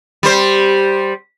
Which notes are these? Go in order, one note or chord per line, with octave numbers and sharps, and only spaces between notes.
G3 C5